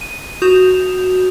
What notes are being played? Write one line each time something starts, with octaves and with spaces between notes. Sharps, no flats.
D#7
F#4 D#6 G6 E7 F7